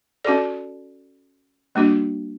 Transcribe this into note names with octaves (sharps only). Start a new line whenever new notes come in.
C#4 F#4 A4 D5
G3 A#3 D4 F#4